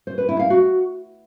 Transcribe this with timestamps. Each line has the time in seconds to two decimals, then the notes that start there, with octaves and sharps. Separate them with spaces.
0.07 C5
0.18 B4
0.29 E4
0.39 F5
0.50 F#4